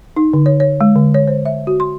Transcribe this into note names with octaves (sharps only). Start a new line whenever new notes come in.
D#4
D3
C#5
C#5
G#3
D3
C#5
C5
E5
F#4
C6